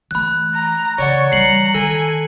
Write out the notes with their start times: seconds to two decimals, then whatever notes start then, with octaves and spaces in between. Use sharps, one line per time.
0.11 E3 A3 B5 F#6
0.54 A#5
0.98 C#3 E3 C#5 D5 F#5 C#6
1.32 E3 G3 A#5 C7 C#7 F#7
1.74 D#3 A4 G#5